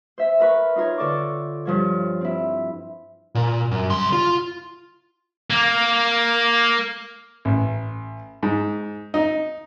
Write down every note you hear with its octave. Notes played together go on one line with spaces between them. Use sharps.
C5 E5
A#4 B4 C#6
D#4 F4 A#4 C#5
D3 A4 D5 C#6 D6
G2 F3 C#5
C4 E4
A#2
F#2
C2 C6
F4
A#3
A1
G#2
D#4